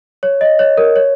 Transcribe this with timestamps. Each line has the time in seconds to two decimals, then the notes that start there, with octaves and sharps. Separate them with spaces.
0.23 C#5
0.41 D#5
0.59 C#5
0.77 A#4
0.96 C#5